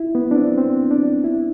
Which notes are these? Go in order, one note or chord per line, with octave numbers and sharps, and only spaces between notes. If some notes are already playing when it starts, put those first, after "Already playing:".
Already playing: E4
B3
D4
C4
C4
D4
E4